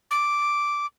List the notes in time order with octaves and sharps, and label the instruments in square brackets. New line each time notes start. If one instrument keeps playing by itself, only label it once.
[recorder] D6